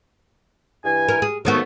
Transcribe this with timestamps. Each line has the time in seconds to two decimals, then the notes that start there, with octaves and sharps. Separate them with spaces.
0.84 G2 E3 G#5
1.09 A#4
1.22 G#4
1.45 F2 D#3 F#3 A3 B3 F#4